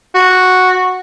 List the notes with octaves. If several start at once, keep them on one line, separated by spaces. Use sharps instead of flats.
F#4